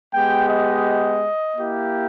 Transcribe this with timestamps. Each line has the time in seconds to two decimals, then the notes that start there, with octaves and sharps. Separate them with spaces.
0.14 G#3 B3 G4 G5
0.50 D#5
1.56 A#3 E4 G4